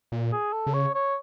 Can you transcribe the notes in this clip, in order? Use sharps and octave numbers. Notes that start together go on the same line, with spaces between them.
A#2
G#4
A4
C#3
C#5
C#5